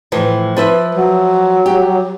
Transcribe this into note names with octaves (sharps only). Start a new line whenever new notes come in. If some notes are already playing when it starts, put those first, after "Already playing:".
A2 E3 F3
F3 B4 E5
F#3
G4